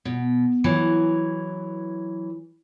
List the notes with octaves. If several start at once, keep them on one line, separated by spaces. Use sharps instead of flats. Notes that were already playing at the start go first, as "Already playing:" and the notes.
B2
E3 F#3